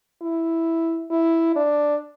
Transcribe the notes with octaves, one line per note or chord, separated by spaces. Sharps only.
E4
E4
D4